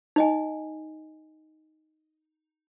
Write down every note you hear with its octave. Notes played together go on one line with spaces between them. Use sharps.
D#4 D#5 G#5